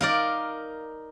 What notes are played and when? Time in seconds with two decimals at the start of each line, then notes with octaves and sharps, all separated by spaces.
0.01 D#4 A#4 D5 F5